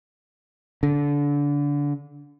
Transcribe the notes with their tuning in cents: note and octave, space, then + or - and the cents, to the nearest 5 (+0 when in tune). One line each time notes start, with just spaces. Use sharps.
D3 -25